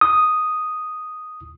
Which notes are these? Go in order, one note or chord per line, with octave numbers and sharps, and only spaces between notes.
D#6